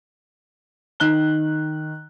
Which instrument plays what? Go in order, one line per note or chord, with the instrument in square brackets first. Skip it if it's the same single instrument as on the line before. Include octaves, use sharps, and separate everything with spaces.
[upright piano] D#3 F#6 G7